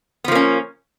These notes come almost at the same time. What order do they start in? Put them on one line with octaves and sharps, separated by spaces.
B3 F3 A#3 C#4